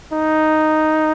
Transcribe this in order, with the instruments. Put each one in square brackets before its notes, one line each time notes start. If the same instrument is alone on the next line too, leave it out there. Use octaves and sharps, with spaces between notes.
[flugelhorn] D#4